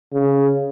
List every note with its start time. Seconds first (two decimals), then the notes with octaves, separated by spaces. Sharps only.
0.13 C#3